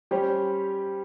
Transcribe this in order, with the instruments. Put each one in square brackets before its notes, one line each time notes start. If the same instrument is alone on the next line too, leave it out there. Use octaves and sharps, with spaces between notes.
[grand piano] G3 C#4 G4 C5